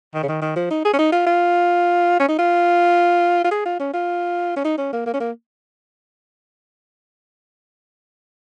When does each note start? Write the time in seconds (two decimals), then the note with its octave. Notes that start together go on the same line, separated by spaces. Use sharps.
0.15 D#3
0.23 C#3
0.29 D#3
0.42 D#3
0.56 F3
0.71 D#4
0.85 G#4
0.93 C#4
0.99 D#4
1.12 F4
1.26 F4
2.20 C#4
2.28 D#4
2.39 F4
3.44 F4
3.51 G#4
3.66 F4
3.80 C#4
3.94 F4
4.56 C#4
4.65 D#4
4.78 C#4
4.93 A#3
5.06 A#3
5.14 C#4
5.20 A#3